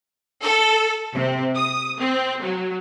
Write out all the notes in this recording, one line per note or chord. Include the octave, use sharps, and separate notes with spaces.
A4
C3
D#6
C4
F#3